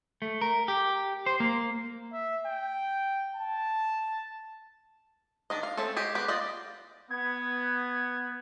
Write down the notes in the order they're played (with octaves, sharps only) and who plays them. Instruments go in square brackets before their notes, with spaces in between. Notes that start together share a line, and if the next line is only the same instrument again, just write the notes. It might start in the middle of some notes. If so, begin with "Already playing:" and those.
[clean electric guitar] A3
A#4
G4
C5
A#3
[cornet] E5
G5
A5
[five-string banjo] D#3 D4 D#5
F5
A3 C4 C#4 A4
G#3 G4 G#4
B3 G4
F4 D5 D#5
[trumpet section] B3 [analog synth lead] G#6